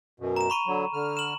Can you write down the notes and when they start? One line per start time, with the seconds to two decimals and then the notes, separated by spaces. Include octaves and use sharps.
0.20 F#2 B2
0.36 A#5 E7
0.50 B5 C#6 D#7
0.67 D3 F#3
0.94 D3 F6
1.17 E7 F#7